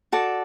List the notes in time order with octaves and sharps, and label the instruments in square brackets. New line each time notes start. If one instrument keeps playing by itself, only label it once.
[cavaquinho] F#4 A4 D5 A5